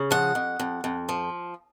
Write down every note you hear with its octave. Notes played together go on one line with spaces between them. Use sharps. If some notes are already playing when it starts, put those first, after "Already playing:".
Already playing: C#3
F3 F#5
F2
F2
F2
F3